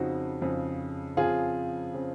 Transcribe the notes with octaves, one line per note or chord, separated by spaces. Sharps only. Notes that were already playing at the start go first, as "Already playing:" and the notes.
Already playing: F2 C#3 F3 C4 D#4 F#4
F2 C#3 F3 C4
F2 C#3 F3 C4 F4 G#4
C#3 F3 C4